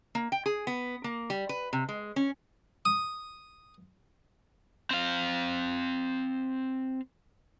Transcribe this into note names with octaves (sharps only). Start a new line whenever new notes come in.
A#3
G5
G#4
B3
A#3
G3
B4
C3
G#3
C#4
D#6
C4 F5